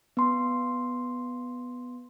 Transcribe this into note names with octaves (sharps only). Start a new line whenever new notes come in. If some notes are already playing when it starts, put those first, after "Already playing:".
B3 C6